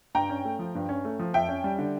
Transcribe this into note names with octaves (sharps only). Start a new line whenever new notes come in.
G2 G5 A#5
C#4
A3
F3
G2
C#4
A3
F3
F2 E5 G5
C#4
G3
D3